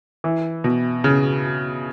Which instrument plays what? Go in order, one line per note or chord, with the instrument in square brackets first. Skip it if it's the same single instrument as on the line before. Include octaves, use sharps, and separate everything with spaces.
[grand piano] E3
B2
C#3